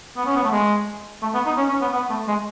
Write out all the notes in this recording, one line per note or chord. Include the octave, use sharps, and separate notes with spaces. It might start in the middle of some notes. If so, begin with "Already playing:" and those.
B3
C#4
B3
A3
G#3
A3
B3
D#4
C#4
C#4
B3
B3
A3
G#3